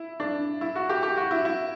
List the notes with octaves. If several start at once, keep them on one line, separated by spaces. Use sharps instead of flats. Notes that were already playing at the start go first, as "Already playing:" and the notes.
Already playing: E4
D4
E4
F#4
G4
G4
F#4
E4
E4